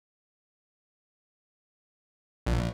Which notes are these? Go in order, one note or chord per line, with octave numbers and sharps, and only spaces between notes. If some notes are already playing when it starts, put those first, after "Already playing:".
A#1